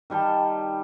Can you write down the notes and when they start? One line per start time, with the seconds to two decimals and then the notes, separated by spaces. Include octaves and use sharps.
0.10 D#3 G3 G5 A5